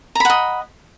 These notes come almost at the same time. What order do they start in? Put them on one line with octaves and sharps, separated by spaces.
A#5 B5 F#5 D#5